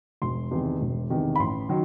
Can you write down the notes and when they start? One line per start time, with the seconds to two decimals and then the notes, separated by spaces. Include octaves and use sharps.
0.22 E1 C6
0.51 E2 C3 D#3
0.81 E1
1.10 E2 C3 D#3
1.36 B5
1.39 A1 C6
1.69 D#3 F#3